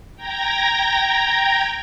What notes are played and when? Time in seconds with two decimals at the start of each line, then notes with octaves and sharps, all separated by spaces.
0.16 G5 A#5 G#6 A#6